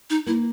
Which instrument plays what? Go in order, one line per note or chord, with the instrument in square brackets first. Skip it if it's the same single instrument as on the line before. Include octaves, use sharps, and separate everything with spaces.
[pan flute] D#4
[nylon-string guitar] A#3 [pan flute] E4